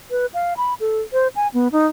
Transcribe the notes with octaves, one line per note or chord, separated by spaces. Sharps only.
B4
F5
B5
A4
C5
G#5
B3
D#4